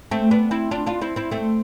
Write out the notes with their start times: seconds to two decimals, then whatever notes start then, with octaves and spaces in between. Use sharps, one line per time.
0.11 A3 C4
0.31 B3 D4
0.51 C4 E4
0.71 D4 F4
0.86 D4 F4
1.01 C4 E4
1.16 C4 E4
1.31 A3 C4